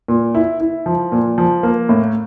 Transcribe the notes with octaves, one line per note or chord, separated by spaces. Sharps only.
A#2
E4
E4
F3
A#2
F3
A#3
A2